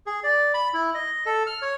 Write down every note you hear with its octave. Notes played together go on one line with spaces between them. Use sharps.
G#4
D5
B5
E4
D#5
A4
F6
C#5